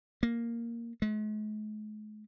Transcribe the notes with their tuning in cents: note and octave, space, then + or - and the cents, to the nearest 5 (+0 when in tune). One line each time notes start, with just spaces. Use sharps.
A#3 +0
G#3 +45